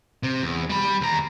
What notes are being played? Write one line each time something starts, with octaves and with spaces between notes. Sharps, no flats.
C3
E2
G3 B5
D#2 A#5